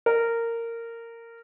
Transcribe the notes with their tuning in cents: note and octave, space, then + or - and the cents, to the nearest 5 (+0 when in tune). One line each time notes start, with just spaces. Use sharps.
A#4 -15